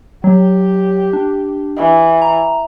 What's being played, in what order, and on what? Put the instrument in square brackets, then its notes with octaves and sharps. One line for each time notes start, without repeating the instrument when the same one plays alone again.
[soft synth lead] F#3 [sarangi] G4
[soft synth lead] D4
[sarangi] E3
[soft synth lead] A#5